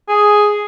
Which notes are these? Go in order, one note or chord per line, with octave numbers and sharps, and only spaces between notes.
G#4